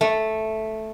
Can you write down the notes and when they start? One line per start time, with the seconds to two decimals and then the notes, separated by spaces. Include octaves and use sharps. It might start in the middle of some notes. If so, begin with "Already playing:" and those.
0.01 A3